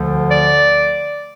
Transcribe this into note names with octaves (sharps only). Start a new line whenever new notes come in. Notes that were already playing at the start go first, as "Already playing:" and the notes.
Already playing: D2 D3 F3
D5